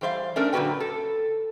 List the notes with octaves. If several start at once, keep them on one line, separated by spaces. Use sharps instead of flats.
E3 G3 C5 E5 F5
A3 C#4 D4 A#4
F#2 A#2 D3 F#4 B4 G5
A4